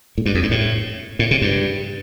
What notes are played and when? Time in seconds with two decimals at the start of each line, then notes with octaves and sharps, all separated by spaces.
0.18 A2
0.26 G2
0.35 F2
0.43 G2
0.51 A2
1.19 A2
1.31 C3
1.42 G2